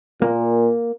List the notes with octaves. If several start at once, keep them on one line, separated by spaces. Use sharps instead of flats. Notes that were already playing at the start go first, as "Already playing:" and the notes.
A#2 A#3